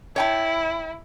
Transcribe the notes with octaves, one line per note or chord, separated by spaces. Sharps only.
E4 C#5 G5 A5